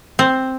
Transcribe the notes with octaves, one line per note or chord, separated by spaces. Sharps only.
C4